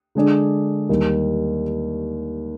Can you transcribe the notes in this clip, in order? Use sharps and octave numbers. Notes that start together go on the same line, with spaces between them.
D3 G#3 D4 G#4 D5
D#2 D#3 G3